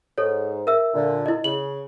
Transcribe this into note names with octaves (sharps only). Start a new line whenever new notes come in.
G#2 A4 C#5
A#4 E5 E6
A#2 D3
E4 D#5
C#3 F#7